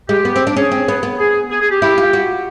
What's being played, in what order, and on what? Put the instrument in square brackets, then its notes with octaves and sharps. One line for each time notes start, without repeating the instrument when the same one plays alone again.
[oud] G#3 [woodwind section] G4
[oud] B3
C4
D4
[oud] C#4 [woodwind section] G#4
[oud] C4
B3
B3
[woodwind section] G#4
G#4
G#4
G4
[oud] E4 [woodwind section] G4
[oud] F4
F#4